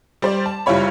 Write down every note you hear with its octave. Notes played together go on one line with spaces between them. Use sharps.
G3 C5 D5
A5
F#1 G3 E4 F4 C#5 B5